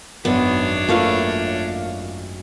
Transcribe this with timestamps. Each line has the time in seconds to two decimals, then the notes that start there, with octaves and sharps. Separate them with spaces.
0.25 G#1 F#2 B3 D4 C#5
0.89 A3 A#3 F4 B4 F5